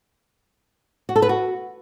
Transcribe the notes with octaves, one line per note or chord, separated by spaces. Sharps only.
F#4
A4
B4
F#4